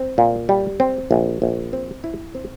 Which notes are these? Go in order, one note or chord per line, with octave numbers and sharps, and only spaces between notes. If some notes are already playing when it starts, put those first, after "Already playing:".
Already playing: C4
A#2
G3
C4
A#1
A#1
C4
E4
C4